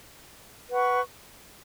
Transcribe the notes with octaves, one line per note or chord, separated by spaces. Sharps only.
B4 F#5 C#6